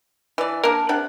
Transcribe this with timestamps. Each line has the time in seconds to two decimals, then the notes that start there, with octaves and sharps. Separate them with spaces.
0.38 E3 D5
0.64 A#3 D4 A#4
0.89 C3 D4 F#5